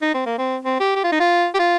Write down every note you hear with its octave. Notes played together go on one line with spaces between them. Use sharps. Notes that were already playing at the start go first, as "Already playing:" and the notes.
D#4
C4
A#3
C4
C4
G4
G4
F4
D#4
F4
G4
F4